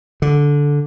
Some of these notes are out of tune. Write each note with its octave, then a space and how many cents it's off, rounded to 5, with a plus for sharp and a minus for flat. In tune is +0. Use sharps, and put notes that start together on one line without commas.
D3 -10